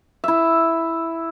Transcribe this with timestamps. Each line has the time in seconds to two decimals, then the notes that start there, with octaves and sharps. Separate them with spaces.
0.24 E4 E5